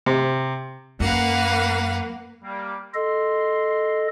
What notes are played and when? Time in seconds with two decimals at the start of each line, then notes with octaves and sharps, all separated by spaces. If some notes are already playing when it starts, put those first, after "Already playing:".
0.06 C3
1.00 F#2 A#3 B4 F5 F#5
2.43 G3 A#3
2.94 A4 D#5 C6